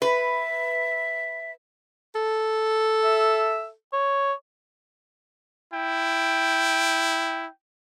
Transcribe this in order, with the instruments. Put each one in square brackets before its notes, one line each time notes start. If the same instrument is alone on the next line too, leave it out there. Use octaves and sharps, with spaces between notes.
[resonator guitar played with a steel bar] B4 [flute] E5
[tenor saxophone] A4
[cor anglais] E5
C#5
[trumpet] E4 [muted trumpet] G5